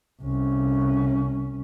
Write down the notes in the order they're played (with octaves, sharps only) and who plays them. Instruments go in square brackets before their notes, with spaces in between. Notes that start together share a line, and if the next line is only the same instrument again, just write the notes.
[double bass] C2 C#4